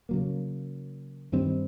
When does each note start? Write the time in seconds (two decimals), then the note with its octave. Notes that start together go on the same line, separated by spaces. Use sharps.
0.09 C#3 F#3 A#3
1.32 G2 D#3 G3 C4